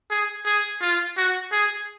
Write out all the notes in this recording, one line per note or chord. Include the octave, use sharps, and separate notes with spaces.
G#4
G#4
F4
F#4
G#4